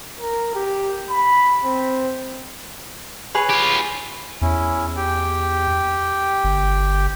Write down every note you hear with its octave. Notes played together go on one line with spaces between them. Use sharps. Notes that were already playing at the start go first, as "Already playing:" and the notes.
A#4
G4
B5
C4
G#4 B4 C#5
F4 G4
E2 C#4 E4
G4 G5
G1